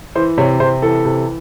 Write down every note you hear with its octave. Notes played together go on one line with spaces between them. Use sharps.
E3 C5
C3 C#5
C3 C5
E3 A4
C3